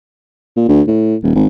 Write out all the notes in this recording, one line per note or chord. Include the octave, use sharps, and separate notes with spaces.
A#2
D2
A2
D#1
G#1